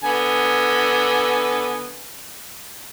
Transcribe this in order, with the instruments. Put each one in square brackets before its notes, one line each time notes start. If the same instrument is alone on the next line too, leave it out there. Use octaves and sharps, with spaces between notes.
[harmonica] D3 B3 G#5